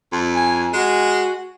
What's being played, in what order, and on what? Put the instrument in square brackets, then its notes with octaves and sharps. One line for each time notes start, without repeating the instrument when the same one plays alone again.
[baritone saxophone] F2
[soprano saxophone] G#5
[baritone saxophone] G#3 [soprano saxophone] F#4